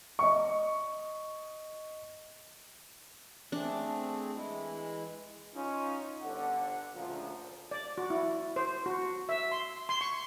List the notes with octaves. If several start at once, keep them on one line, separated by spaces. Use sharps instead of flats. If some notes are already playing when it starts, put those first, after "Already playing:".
D#5 C#6
A3 C4 D4 G#4
E3 G#3 E4
C#4 D#4 F4
G1 D3 F#5
D2 A#2 C#3 F3
D5
F#4
E4
C5
F#4
E5
C6
C6
C#6